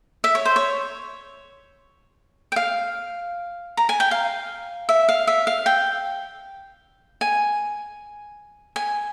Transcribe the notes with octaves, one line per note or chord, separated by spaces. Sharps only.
E5
C#5
C5
C#5
G5
F5
A#5
G#5
G5
F5
E5
F5
E5
F5
G5
G#5
G#5